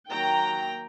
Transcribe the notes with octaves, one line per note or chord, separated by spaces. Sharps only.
D#3 F#3 A#3 G5 A#5